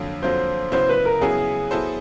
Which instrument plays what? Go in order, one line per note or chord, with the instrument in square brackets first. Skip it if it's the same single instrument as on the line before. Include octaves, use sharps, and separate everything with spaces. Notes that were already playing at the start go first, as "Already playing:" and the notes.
Already playing: [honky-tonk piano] F2 D3 F#3 A#3
[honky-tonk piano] F2 D3 F#3 A#3 [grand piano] C5
[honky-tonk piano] C#3 F#3 B3 E4 [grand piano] C5
[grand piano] B4
A#4
[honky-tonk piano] C#3 F#3 B3 E4 [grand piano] G#4
[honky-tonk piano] F#3 B3 E4 A4 C5